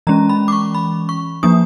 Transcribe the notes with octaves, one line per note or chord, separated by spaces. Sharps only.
E3 G#3 C#4 A#5
B5
D6
C#6
B5
C#6
F3 A#3 D4 D#6